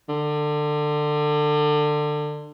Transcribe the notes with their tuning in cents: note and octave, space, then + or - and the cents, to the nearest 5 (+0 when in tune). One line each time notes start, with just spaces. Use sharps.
D3 +25